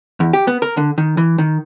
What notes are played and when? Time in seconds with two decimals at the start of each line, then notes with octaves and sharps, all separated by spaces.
0.20 E2
0.33 G4
0.47 B3
0.62 A#4
0.77 D3
0.98 D#3
1.17 E3
1.38 D#3